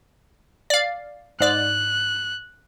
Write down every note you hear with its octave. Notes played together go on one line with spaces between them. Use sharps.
D5 F5
G#2 D5 F#6